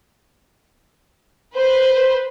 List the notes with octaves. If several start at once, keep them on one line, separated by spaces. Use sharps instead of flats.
B4 C5